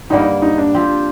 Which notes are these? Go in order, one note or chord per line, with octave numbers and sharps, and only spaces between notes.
G2 D3 G3 A#3 D#4
D#4
D4
F3 C4 G4